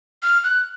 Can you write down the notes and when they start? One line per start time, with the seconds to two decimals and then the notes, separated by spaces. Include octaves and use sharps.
0.23 F6
0.44 F#6